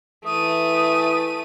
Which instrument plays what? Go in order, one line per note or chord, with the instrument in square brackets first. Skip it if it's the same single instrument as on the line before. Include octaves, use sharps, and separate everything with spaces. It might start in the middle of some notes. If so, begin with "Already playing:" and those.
[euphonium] E3 [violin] A3 D#7 [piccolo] D#6